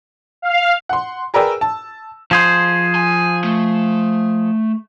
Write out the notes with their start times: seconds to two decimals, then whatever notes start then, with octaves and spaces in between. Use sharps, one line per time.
0.42 F5
0.89 F#5 C6
1.34 G#4 A#4 B4 D5 G5 E6
1.61 A5
2.31 F3 G#4 C5
2.95 G#5
3.44 A3